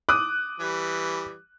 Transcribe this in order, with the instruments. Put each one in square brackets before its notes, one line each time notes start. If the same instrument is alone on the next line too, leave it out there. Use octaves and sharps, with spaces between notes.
[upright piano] D6 D#6 [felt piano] F#6
[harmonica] E3 G3